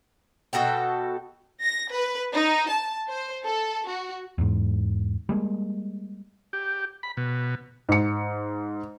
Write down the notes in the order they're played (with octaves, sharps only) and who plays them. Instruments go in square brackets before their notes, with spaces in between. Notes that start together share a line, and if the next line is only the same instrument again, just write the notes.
[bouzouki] B2 F#4 A4 G5
[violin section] A#6
B4
D#4
A5
C5
A4
F#4
[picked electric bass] E2 G#2
G3 G#3 A#3
[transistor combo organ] G4
B5
B2
[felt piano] G#2 C#7